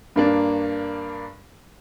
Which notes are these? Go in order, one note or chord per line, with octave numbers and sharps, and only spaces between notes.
G2 A#3 D4